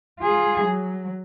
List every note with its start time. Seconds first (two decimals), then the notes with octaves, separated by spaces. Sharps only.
0.20 F4 G#4
0.64 F#3